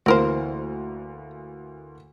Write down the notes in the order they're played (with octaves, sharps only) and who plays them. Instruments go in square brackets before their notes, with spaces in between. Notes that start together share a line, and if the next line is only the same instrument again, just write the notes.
[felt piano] D2 E3 A#3 [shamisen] C4 A#4 C5